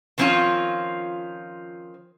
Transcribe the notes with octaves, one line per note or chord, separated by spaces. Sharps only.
D#3 F3 C4 C#4 F4